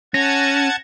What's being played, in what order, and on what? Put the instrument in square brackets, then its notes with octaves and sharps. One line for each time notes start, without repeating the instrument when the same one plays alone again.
[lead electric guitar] C#4 [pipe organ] F#5 A5 G#6 [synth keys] A#6